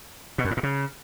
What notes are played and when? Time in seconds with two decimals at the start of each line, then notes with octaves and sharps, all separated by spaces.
0.38 B2
0.45 F#2
0.51 A2
0.57 A#2
0.63 C#3